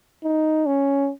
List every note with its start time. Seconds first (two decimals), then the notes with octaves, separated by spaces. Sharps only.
0.24 D#4
0.66 C#4